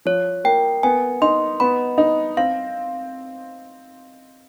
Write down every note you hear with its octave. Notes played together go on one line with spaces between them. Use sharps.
F3 C#5
A#3 G5
B3 G#5
D#4 C6
B3 B5
D#4
C4 F5